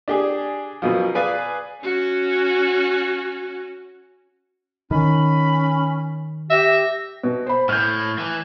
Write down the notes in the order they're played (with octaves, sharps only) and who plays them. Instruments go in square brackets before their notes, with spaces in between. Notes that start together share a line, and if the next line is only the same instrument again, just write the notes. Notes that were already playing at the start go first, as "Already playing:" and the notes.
[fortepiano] D4 G4 G#4
F#2 B2 F3
G#4 B4 D5 F5 G#5
[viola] C#4 F#4
[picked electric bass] D#3 [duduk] C#4 [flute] B5
[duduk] G4 [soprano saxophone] E5 [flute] A#6
[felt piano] B2
C5 B5
[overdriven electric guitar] A2 [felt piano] F6 G6
[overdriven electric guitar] E3